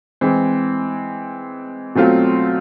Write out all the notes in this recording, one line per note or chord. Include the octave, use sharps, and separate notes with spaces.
E3 G#3 C4
B2 F#3 A3 C4 F4